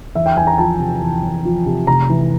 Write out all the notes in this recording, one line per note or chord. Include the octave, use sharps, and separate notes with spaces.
E2 E5
G5
E2 G#5
A#5
F3 A5
C3
E2
E2
F3
C3
F1 A#5
E3